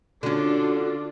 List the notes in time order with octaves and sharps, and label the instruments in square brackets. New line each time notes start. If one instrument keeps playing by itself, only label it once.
[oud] D3 C#4 [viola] D4 F4 [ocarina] F#4